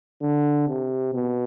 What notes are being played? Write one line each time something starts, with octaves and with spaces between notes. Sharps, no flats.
D3
C3
B2